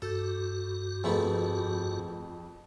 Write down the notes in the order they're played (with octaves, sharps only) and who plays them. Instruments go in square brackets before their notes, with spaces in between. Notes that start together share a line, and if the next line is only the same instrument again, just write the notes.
[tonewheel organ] G2 F#4 [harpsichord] A4
[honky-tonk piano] F2 [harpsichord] G#2 A3 B3